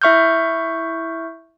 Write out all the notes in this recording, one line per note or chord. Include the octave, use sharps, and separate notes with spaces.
E4 E5 C#6 F6 G6